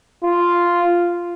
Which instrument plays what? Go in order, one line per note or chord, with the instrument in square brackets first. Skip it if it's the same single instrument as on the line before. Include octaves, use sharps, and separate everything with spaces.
[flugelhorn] F4